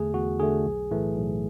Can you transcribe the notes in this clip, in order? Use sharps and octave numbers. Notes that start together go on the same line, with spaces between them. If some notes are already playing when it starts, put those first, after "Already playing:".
Already playing: E2 D3 A3 G#4
E2 F#4
D3 A3 G#4
B1
A2 E3 A3
B1